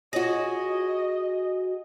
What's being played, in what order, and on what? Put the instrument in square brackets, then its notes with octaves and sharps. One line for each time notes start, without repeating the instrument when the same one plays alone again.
[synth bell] F4 C#5 A#6 [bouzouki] F#4 G#4 [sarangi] D#5